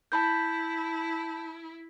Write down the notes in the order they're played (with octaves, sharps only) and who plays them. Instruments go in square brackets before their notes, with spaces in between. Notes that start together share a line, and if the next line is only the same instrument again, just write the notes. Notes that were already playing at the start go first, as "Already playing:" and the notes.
[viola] E4 [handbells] A5 B5 G6